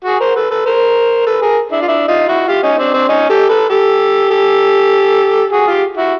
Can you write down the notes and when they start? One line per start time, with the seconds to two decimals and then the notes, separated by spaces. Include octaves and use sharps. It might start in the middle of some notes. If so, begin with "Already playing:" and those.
0.05 F#4 G#4
0.20 A#4 C5
0.36 A4 B4
0.51 A4 B4
0.66 A#4 C5
1.26 A4 B4
1.42 G#4 A#4
1.72 D4 E4
1.82 F4
1.88 D4 E4
2.08 D#4 F4
2.28 E4 F#4
2.48 F4 G4
2.63 C#4 D#4
2.78 C4 D4
2.94 C4 D4
3.09 C#4 D#4
3.30 G4 A4
3.49 A4 B4
3.70 G4 A4
4.30 G4 A4
5.52 F#4 G#4
5.67 F4 G4
5.97 E4 F#4